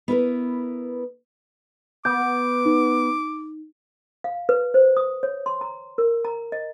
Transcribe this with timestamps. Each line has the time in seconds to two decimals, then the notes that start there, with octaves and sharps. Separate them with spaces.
0.08 B3 E4 A#4 B4
2.05 B3 D6 G6
2.65 D#4
4.24 F5
4.49 B4
4.74 C5
4.97 D#6
5.23 C#5
5.46 C6
5.61 A#5
5.98 A#4
6.25 A#5
6.52 D#5